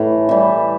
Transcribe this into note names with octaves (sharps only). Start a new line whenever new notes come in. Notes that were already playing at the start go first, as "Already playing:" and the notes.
Already playing: A2 E3
E3 G3